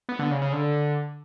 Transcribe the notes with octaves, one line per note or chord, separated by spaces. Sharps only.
B3
D3
C#3
C#3
D3